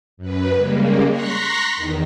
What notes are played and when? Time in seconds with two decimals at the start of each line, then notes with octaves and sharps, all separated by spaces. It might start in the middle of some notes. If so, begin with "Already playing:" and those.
0.17 F#2 B4
0.55 C#3 G3 G#3 A#3
1.09 A#5 C6 C#6 F#6 A#6 B6
1.73 E2 D#3